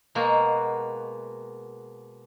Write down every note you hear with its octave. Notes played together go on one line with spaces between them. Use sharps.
B2 G#3 A#3 F#4